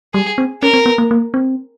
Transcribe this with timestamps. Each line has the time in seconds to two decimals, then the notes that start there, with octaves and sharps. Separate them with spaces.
0.14 G3 G#4
0.38 C4
0.62 C#4 A#4
0.74 C4
0.86 B3
0.98 A#3
1.11 A#3
1.34 C4